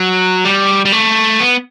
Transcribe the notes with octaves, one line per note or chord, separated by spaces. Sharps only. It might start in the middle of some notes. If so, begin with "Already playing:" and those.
Already playing: F#3
G3
G3
A3
B3